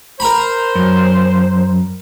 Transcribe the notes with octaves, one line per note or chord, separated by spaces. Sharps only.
A#4 C5 A#5 B5
F#2